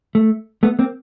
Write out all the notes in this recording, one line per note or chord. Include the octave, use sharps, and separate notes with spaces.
A3
A3 B3
A#3 C4